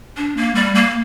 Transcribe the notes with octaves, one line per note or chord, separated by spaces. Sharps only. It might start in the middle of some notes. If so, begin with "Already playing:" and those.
D4
A#3
G3
A#3